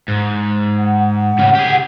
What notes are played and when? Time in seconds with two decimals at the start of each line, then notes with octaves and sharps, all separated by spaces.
0.08 G#2
0.78 F#5
1.39 A2 C#3
1.55 G4 G#4